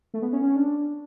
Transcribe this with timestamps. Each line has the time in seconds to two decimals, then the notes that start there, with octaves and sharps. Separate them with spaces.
0.14 A3
0.22 B3
0.33 C#4
0.44 C#4
0.56 D4